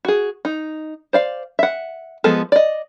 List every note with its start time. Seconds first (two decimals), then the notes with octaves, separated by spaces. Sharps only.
0.05 F#4 G#4
0.45 D#4
1.13 C5 D5 F5
1.59 E5 F#5
2.24 F3 G#3 B3 A4
2.52 D5 D#5